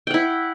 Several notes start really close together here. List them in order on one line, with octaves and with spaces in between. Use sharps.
G5 F#5 E4